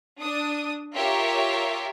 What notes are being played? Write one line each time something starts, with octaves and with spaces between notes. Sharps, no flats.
D4 D#6
F4 G4 A#4 C#5 E5